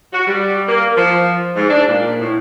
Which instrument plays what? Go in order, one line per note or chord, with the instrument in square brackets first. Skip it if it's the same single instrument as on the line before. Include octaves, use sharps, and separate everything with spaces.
[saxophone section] F#4
G3
A#3
F3
G#2
D4
A#2
A2